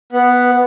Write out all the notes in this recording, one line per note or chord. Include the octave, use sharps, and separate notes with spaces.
B3